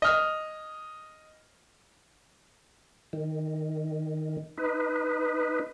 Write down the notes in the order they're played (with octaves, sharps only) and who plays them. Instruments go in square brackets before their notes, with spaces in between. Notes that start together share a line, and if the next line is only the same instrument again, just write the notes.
[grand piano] D#5 F6
[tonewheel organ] D#3
D#4 B4